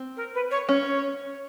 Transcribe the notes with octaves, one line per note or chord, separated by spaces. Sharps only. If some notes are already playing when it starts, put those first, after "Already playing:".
Already playing: C4
A#4
B4
C#5
C#4 C#5